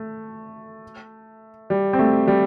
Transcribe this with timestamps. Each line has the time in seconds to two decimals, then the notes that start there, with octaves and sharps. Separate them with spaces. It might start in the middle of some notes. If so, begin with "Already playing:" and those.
Already playing: A3
1.70 G3
1.93 C4
1.99 A3
2.28 G3